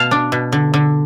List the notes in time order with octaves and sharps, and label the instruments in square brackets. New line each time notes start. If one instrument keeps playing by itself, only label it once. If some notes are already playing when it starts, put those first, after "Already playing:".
Already playing: [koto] B2 F5 A5
D4
B2
D3
D3